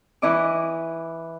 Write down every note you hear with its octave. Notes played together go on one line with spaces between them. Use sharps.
E3 E4 D#5 C#6 D6